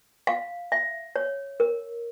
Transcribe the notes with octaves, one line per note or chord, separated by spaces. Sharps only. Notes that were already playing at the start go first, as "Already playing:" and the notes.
F5
E5
C#5
A#4